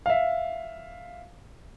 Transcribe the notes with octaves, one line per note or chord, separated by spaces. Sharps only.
E5 F5